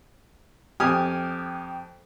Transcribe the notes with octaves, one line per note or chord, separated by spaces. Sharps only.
F2 G4 G#5 D#6 F6